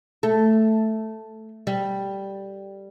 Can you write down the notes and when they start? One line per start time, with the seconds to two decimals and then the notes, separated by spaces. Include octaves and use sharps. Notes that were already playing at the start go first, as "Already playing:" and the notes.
0.23 A3
1.67 G3